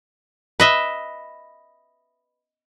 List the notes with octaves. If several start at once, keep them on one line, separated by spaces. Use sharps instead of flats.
B4 D#5 E5